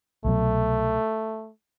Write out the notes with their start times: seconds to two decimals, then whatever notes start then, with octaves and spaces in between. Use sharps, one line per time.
0.25 C2 B2 F#3 A3